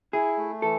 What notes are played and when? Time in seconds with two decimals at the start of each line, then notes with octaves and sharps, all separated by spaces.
0.13 E4 G#4
0.38 A3
0.62 E3 A4